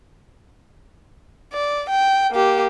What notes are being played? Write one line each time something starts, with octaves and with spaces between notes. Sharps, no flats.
D5
G5
A#3 G4